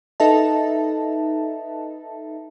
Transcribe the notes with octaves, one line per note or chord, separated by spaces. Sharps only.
D#4 A4 B4 D#5 E5 A5